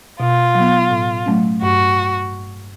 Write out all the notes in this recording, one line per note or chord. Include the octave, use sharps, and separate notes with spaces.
B2 F4
F#3
B3
A2
F#3 A3 C#4
G2 F#4